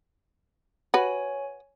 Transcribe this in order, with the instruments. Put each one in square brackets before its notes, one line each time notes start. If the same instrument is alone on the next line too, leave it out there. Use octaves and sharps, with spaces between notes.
[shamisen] F#4 B4 [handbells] C#5 G#5